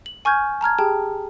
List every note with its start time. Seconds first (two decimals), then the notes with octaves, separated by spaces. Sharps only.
0.06 F#7
0.25 G#5 C#6 F6 G6 G#6
0.61 A5 A#5 F6 G#6
0.79 G4 G#4 G5 A5